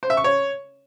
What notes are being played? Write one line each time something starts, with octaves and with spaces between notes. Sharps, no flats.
C5
E5
C#6
C#5